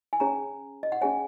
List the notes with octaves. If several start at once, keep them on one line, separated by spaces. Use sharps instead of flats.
G#5
C#4 G#4 C#5 A#5
D#5
F#5
C#4 G#4 C#5 G#5